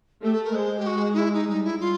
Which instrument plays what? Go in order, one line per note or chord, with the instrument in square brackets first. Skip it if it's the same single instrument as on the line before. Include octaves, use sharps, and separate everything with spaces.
[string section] A3 [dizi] G4
[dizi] A4
A#4
[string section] G#3 [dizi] C5
[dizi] G4
F#4
D#4
E4
D#4
[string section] G3 [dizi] D#4
[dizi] E4
F4